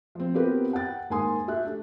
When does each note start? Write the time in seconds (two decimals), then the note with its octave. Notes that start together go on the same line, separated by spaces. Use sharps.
0.15 F3 C4
0.34 B3 C4 F4 G4 A#4 B4
0.73 F#5 G5 A6
1.10 G#2 A#3 G#5 C6 D#6
1.48 G4 E5 F#6
1.64 A3 D4